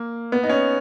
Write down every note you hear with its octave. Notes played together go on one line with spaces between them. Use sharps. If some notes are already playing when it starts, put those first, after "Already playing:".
Already playing: A#3
B3
D#4
C#4